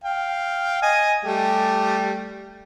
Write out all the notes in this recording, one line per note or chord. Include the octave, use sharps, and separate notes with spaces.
F5 G5
D#5 G#5
G3 A3 G4